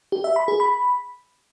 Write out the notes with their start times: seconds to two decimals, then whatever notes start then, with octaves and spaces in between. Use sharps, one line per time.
0.12 G4
0.24 E5
0.36 B5
0.48 G#4
0.60 B5